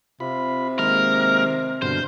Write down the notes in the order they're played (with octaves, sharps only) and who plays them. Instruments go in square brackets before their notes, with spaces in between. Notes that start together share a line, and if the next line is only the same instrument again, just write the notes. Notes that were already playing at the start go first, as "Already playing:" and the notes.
[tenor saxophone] C3 [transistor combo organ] F4 B5
[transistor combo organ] D#3 G#3 A#3 [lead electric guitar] A#4
[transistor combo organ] G2 B2 D3 [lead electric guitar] C5